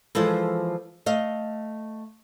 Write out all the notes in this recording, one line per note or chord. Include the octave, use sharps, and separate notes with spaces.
E3 F3 G#3 A4 C5
A3 D#5 F5